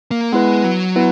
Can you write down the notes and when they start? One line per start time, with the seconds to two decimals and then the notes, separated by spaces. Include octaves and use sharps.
0.11 A#3
0.32 G#3 B3 E4 B4
0.64 F#3
0.96 B3 E4 B4